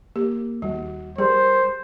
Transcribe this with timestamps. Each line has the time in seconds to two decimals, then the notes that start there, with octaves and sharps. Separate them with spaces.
0.16 A#3 G4
0.62 D#2 G3 F#4
1.18 G3 G#4 A#4 C5